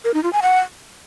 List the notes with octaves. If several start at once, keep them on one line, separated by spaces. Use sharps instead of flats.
A#4
D#4
F4
G#5
F#5